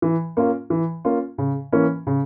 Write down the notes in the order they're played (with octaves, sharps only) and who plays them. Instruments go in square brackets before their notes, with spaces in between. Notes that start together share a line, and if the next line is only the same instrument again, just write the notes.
[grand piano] E3
A#3 C#4 F4
E3
A#3 C#4 F4
C#3
E3 A#3 C#4
C#3